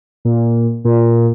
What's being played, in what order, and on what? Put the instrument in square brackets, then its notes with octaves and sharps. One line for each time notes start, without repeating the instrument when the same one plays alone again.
[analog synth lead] A#2
A#2